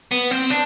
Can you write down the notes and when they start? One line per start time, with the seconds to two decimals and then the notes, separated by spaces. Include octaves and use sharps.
0.11 B3
0.31 C4
0.50 D4